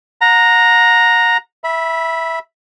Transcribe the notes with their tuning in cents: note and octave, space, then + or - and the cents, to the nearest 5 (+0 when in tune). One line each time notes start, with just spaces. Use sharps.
F#5 -35 A#5 +0
E5 +0 B5 -20